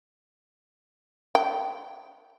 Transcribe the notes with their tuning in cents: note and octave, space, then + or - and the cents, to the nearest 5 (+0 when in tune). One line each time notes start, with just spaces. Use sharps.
G5 -10